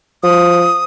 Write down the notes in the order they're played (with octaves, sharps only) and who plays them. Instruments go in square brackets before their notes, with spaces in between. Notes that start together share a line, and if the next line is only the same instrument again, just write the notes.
[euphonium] F3 [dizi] D#6